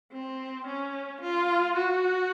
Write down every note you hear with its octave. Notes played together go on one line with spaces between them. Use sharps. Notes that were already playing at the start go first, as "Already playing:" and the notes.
C4
C#4
F4
F#4